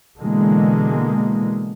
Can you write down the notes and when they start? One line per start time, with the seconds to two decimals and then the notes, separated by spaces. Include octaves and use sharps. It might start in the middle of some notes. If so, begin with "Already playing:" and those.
0.18 B2 D3 E3 G#3 A#3